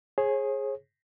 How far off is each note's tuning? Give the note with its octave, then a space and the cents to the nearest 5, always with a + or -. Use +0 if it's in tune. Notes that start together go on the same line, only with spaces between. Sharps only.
G#4 +5 C#5 -40